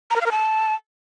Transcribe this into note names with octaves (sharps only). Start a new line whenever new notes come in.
A#5
A#4
F5
A#4
A5